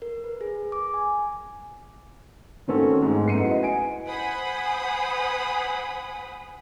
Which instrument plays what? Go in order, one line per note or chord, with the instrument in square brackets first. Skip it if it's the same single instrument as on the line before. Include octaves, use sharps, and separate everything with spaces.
[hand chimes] A#4
B4
G#4
D6
G#5
[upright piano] D#3 A#3 C4 C#4 F#4 A4
G#2 G#3
F#1 A3 B3 C7 C#7 D#7
E4 F#4 B4 D#5
G#5 D7
[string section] C5 F#5 G#5 B5 D#6